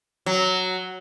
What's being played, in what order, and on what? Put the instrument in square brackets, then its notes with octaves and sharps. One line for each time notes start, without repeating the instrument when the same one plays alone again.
[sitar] F#3